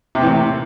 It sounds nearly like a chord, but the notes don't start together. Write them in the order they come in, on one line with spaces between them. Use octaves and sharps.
C3 C4 E3 A2 A#3